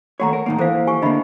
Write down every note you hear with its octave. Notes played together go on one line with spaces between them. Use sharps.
D#2 A3 F#4 C#5 F#5 A#5
A#4
A2 D#3 A#3
E3 A#3 A4 C5 F5
G4 G#5 C#6
D3 A#3 D#5 E5 B5